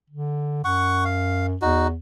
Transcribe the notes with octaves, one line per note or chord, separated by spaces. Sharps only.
D3
F#2 F#5 C#6
F5
E2 D#4 F#4